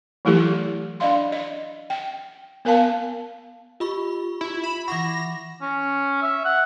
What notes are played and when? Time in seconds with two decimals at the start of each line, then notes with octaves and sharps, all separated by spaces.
0.25 E3 F#3 A3 E4 G4 A4
1.00 D4 D5 D#5 F5 C6
1.32 D#5
1.90 G5
2.65 B3 A#4 F5 A5
3.80 F4 G4 B5 C#6
4.41 E4
4.64 B5 E7
4.88 E3 E4 F#5 B5 C#6 D6 A#6
5.62 C#4
6.22 E5
6.45 F#5